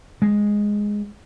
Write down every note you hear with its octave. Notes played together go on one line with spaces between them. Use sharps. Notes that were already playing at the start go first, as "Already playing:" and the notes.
G#3